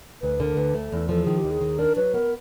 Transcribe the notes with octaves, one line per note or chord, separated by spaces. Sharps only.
D2 B4
D3 A#4
D2 B4
A3
E2 A4
F3 A4
D#3 G#4
G4
D#2
G#4
D#3
D4 A#4
F#3 B4
B3 A#4